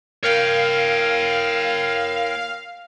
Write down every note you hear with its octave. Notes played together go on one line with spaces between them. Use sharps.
A#4 C#5 F5 G5